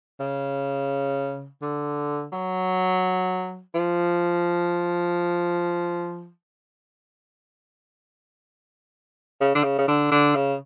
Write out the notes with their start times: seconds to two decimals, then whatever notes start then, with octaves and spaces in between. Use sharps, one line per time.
0.20 C#3
1.62 D3
2.33 F#3
3.75 F3
9.41 C#3
9.55 D3
9.64 C#3
9.79 C#3
9.88 D3
10.12 D3
10.35 C#3